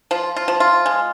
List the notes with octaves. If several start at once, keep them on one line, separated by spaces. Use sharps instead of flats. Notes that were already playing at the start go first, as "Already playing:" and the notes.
F3 F4
F4
F3
F4
G#3